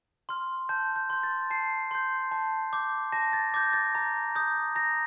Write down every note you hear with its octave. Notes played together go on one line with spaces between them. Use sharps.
C6 F6
A5 G6
G6
C6 G6
A6
A5 C7
C6 G6
A5
D6 G6
A5 A#6
A6
D6 G6 A#6
A6
A#5
D#6 G6
A#5 A#6